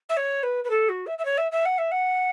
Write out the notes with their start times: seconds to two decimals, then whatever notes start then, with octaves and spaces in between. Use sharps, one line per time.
0.09 E5
0.16 C#5
0.43 B4
0.64 B4
0.70 A4
0.88 F#4
1.06 E5
1.18 E5
1.25 C#5
1.37 E5
1.51 E5
1.65 F#5
1.78 E5
1.91 F#5